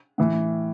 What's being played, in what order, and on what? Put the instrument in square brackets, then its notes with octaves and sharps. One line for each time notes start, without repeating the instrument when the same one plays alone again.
[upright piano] A2 E3